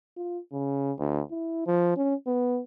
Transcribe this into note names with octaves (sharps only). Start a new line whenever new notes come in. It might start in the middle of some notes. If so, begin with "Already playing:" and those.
F4
C#3
D2
E4
F3
C#4
B3